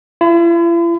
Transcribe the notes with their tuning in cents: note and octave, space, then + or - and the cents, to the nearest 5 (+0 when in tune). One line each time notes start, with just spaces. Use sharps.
E4 +45